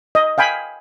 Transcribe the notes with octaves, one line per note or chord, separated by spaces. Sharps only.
D#5
F5 G5 G#5 B5